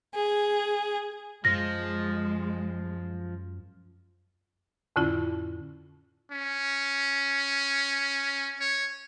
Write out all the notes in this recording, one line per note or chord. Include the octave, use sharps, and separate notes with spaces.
G#4
F#2 F3 G#3 A#6
F2 A2 D3 C#4 E4 F4
C#4
C#5